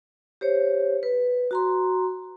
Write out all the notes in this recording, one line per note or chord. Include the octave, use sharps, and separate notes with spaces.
G4 C5 C#5
B4
F#4 A#5 C6